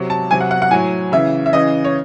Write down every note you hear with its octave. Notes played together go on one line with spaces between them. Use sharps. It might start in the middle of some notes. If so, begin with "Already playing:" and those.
Already playing: C3 F#3
A5
C3 F#3 G#5
F#5
F#5
F#5
A2 F#3 G#5
C#3 E3 E5
E5
C#3 E3 D#5
C#5